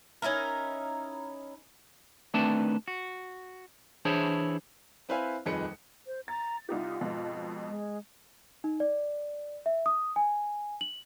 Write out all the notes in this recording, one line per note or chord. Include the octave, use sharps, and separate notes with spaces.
C#4 D#4 E4 A#4
D#3 A3 C4 D4 B4 A5
F#4
E3 D4 E4 G#4 C5 C#5
C4 E4 B4 C5 F5 G#5
D#1 F2 D#4 G#4 B4 C#7
C5
A#5 A6
C2 D#4 F4 G4
F2 G#2 B2
G#3
D#4
D5
E5
D#6
G#5
F#7